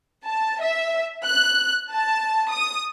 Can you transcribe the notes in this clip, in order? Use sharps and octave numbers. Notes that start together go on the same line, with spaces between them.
A5
E5
F#6
A5
D#6